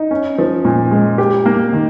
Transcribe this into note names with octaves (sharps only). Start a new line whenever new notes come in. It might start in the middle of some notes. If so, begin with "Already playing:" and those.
Already playing: D#4
C#4
F3
A#2
G#3
G4
A#3
D#3